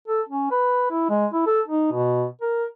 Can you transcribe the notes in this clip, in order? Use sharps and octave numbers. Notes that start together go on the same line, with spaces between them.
A4
C#4
B4
E4
G#3
E4
A4
D#4
B2
A#4